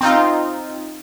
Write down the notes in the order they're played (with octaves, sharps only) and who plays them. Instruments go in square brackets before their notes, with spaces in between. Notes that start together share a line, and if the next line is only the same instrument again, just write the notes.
[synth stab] C4 D#4 F4